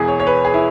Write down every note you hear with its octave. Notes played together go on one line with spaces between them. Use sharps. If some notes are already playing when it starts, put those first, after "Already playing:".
Already playing: E1 E2 E3 G#4
C#5
C#5
B4
G#4
E4